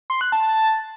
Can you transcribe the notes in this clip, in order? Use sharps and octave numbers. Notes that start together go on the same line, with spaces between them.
C6
F#6
A5